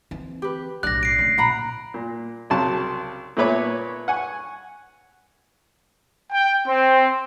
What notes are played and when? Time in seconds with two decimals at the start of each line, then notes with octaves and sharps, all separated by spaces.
0.11 E3 C4
0.42 G4 B4
0.83 B1 A2 D4 D5 F#6 A#6
1.03 C7 D7
1.19 C#3 A3
1.38 A#2 F#5 A#5 B5
1.94 A#2
2.50 C2 C#3 F#3 A5 C6
3.37 A#2 A3 B3 B4 C#5 D6
4.08 F#5 G#5 C#6
6.33 G5
6.68 C4